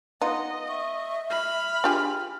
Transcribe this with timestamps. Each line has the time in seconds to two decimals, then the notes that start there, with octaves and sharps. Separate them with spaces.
0.21 B3 D#4 F4 D#5 F#5
0.69 E5 C#6
1.30 B5 F6
1.84 D4 F4 G4 G#4